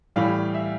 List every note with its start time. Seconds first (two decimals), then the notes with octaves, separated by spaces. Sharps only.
0.16 A2 E3 G3 F5
0.54 E5